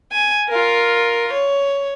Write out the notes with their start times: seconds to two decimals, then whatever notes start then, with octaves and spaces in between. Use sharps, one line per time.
0.12 G#5
0.49 F4 A#4
1.33 C#5